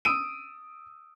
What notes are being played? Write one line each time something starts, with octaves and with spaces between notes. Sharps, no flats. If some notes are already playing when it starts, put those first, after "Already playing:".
D#6 E6 D7 D#7